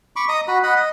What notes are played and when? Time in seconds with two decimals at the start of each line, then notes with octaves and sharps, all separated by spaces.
0.16 B5 C#6 D6
0.29 D#5 A#5 D#6
0.48 F#4 B5
0.63 D#5 F#5 B5
0.76 D#5